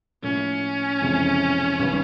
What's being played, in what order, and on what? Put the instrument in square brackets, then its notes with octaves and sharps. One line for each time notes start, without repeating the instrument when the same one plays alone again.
[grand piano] A2 F3 A#3 [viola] C#4
[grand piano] F1 F2 C#3 E3 G#3
G#1 D#3 G3 B3